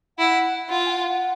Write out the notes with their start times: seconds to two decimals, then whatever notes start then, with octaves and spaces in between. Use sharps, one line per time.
0.18 E4 F#5
0.69 F4 F#5
0.87 G#5
0.90 F#5
1.04 F5
1.07 F#5